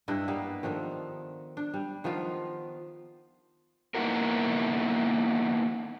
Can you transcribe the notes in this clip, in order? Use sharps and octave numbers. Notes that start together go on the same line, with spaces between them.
G2 D4 E4 D#5
G3 A#3 B3
D#3 F3 D4 A4
D4
G3
D#3 F3 B3 F4
A#3 B3 D#4 E4 F#4 A#4